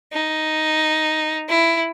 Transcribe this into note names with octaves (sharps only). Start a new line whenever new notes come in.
D#4
E4